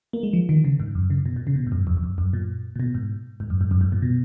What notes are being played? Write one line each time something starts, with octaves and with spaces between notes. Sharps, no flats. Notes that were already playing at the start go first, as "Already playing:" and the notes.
A#3
G#3
F3
D#3
C#3
G#2
F#2
C#3
B2
A#2
C#3
B2
G#2
F#2
F2
F2
F#2
F#2
A#2
A#2
B2
G#2
G#2
F#2
G#2
F#2
G#2
A#2
B2